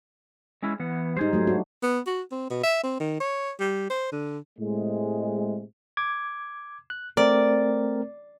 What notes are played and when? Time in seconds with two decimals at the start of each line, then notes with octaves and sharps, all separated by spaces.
0.63 G#3 C#4 E4
0.80 E3 B3 F#5
1.17 G#2 G3 D#4 G#4 C5
1.33 F#3 A3
1.47 D4 F#4
1.83 B3
2.06 F#4
2.32 C4
2.50 B2
2.63 E5
2.83 C4
3.00 D#3
3.20 C#5
3.60 G3
3.90 C5
4.12 D3
4.59 A2 C3 G#3
5.97 D6 G#6
6.90 F#6
7.17 A3 C4 A#4 D5